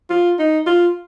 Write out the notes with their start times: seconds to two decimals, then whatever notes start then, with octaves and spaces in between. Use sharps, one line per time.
0.10 F4
0.39 D#4
0.67 F4